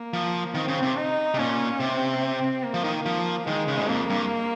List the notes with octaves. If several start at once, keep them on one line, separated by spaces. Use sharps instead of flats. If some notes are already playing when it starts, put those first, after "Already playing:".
Already playing: A#3
F3
D#3 C4
C#3
C3
D#4
C3
A#2 C#4
C3 C4
A#3
F3
D#3
F3
D#3 G#3
C#3
G2
F2 A#3
G2